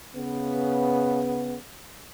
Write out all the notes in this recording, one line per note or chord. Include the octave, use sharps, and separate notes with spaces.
C#3 B3